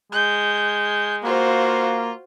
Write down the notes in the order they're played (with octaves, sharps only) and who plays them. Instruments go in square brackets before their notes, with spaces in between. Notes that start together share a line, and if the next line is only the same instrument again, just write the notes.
[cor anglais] G#3 [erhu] G6
[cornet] A#3 [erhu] F4 [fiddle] F#4 C5